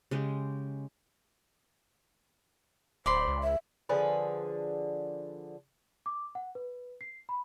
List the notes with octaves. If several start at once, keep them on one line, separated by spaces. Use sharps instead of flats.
C#3 G#3 G4
D1 C5 D5 B5 C6
C#2
E5
D3 F3 G#4 B4
D6
F#5
B4
C7
B5